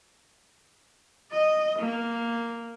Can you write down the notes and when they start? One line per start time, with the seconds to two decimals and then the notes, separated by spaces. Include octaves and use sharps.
1.32 D#5
1.79 A#3